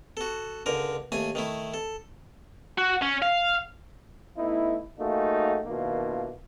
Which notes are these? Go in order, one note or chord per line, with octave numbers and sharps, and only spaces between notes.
F#4 A4
C#2 D3 A#4
D#2 A3 G#5
D#3 A3 E4
A4
F#4
C#4
F5
A3 B3 D#4 E4
A3 A#3 D#4 F4 F#4 G#4
B2 D#3 A#3 D4 E4 F4